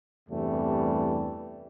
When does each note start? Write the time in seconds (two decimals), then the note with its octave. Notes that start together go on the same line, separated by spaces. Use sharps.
0.29 E2 G2 C3 E3 G3 A3